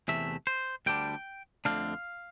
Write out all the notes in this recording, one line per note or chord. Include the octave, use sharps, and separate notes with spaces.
E2 C3 E3 A3 E5
C5
D2 D3 G3 D4 G5
F2 D3 A3 D4 F5